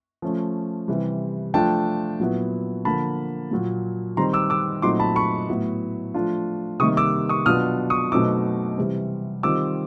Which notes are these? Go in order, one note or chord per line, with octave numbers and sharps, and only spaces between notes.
F3 A3 C#4
C3 E3 G3
F3 A3 D4 F4 G5 A5
A#2 F#3 B3 E4
D3 F3 A#3 A5 B5
A#2 F#3 A#3
D#3 G3 C4 A#5 C6
D6 E6
D6 E6
A#2 F#3 A3 C4 D#4 C6 D6
A5 B5
B5 C#6
A2 F#3 B3 E4
F3 A3 D4 F4
C3 D#3 G3 A#3 C#6 D#6
D6 E6
C#6 D#6
B2 F#3 B3 D4 F4 D#6 F6
C#6 D#6
B2 F#3 A3 C4 D#4 D6 E6
C3 E3 G3 C4
D#3 G3 C4 F4 D6 E6